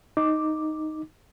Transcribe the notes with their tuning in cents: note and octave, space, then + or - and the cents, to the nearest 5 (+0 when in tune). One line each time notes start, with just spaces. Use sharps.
D#4 +0 D6 +0